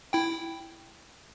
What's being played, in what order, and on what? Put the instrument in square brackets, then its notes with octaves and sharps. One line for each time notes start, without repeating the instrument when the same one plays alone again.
[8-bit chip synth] E4 G5